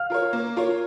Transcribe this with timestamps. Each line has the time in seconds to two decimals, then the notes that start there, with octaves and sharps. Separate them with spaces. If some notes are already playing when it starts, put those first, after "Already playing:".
Already playing: F5 F6
0.10 F4 A#4 C#5
0.33 A#3
0.57 F4 A#4 C#5